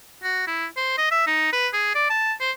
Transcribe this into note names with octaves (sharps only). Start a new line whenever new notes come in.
F#4
E4
C5
D#5
E5
D#4
B4
G#4
D5
A5
C5